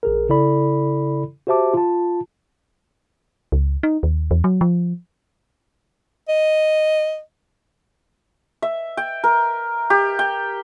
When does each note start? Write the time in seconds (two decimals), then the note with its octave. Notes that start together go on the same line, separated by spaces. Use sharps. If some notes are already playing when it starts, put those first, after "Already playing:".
0.03 A#1 G#4 A#4
0.29 C#3 E4 A4 D5 B5
1.47 F#4 G4 C5 E5 A5 D6
1.74 F4 A5
3.52 C#2
3.83 D#4
4.03 D#2
4.31 E2
4.44 F#3
4.61 F3
6.29 D#5
8.62 E5
8.97 G5
9.24 A#4
9.90 G4
10.19 G5